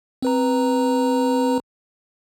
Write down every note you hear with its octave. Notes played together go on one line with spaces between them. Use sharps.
C4 B4 A#5